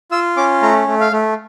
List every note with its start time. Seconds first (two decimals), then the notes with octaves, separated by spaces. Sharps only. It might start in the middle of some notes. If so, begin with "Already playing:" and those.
0.11 F4 E6
0.37 C#4 D6
0.62 A3 A#5
0.88 A3
1.01 F5
1.12 A3